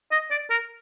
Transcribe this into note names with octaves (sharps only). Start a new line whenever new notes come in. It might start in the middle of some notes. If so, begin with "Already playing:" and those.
D#5
D5
A#4